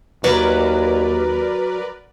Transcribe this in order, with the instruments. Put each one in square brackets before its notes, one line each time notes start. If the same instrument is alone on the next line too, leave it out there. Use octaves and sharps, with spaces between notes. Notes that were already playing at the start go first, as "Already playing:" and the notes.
[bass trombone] D#2 [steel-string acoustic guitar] F#3 [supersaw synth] A#4 B4 D5